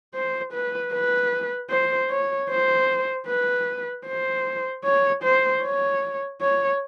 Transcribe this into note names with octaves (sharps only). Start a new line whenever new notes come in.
C5
B4
B4
C5
C#5
C5
B4
C5
C#5
C5
C#5
C#5